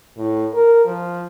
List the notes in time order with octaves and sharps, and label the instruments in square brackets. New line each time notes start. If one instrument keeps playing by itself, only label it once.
[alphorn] A2
A#4
F3